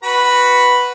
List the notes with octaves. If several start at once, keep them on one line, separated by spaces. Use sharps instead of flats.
F#4 B4 B5